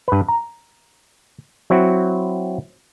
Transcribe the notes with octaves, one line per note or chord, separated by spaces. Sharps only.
G2 B4
A#5
F#3 C4 E4 F#4